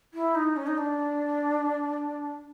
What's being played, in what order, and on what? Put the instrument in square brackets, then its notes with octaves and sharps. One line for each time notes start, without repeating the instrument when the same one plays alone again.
[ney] E4
D#4
C#4
D#4
D4